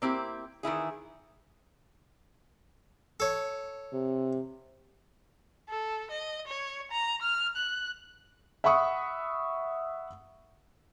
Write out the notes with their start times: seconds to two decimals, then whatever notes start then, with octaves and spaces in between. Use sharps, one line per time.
0.02 A#3 C4 E4 G4
0.63 D#3 E3 E4 G#4
3.20 A4 C#5
3.93 C3
5.69 A4
6.11 D#5
6.47 C#5
6.91 A#5
7.22 F6
7.56 F#6
8.64 E5 F#5 B5 C#6 D#6